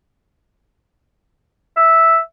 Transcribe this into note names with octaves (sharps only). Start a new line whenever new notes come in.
E5